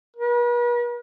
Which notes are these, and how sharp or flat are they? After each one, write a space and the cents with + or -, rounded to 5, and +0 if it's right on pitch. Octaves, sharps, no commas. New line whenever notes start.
B4 -45